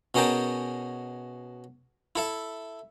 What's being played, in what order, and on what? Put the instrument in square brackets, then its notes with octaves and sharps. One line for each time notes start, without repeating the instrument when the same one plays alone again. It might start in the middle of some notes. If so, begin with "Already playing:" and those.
[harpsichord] B2 C#4 G#4 A#4 G5 A5
E4 A4 E5